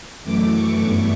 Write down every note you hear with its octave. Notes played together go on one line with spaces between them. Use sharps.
F#2 E3 A3 D6
C#6
G2 E3 B3 C#6